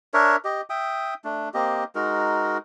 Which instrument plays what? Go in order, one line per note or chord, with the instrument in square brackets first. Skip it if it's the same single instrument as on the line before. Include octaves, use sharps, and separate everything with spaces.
[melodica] D4 A#4 C#5 E5
G4 D#5
E5 G5 D#6
A3 D4
A#3 C4 G4 D#5
G#3 D#4 F#4 A#4